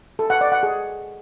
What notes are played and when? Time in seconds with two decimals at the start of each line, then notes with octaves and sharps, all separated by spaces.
0.19 A4
0.30 F#5
0.41 D5
0.52 F#5
0.63 G#4